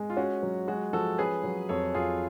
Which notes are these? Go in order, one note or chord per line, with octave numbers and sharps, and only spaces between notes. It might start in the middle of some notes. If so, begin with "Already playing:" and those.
Already playing: G#3
F4
C#4 F#4
F#3
G#3 F#4
F3 F#4 A4
C#4 G#4 B4
F#3
F2 A4 C#5
F2 F4 G#4